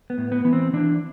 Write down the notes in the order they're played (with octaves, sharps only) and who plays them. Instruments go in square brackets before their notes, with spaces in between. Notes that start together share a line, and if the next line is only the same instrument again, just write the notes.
[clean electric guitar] B3
A2
B3
E3 B3
C4
E3 D4